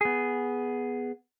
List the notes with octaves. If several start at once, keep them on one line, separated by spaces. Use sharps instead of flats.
B3 G#4